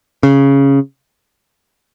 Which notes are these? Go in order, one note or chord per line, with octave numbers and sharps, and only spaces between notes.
C#3